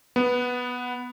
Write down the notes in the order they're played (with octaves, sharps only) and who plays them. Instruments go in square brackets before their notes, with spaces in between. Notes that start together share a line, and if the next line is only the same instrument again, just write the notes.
[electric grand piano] B3